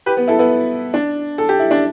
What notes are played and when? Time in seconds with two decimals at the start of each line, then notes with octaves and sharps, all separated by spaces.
0.06 G4 B4
0.17 B3
0.28 E4 A4
0.39 B3 E4
0.94 D4
1.38 A4
1.49 G4
1.60 E4
1.71 D4